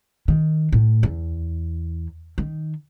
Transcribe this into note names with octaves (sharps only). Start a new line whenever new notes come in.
D#3
A2
E2
D#3